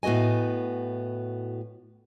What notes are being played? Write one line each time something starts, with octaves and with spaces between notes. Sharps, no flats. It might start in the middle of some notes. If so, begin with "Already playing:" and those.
A2 B3 F#4 D#5 G#5